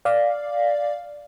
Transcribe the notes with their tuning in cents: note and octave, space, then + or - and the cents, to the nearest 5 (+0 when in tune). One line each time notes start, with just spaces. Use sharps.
D5 +0 F5 +0